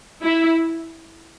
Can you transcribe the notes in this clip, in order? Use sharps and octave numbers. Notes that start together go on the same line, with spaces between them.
E4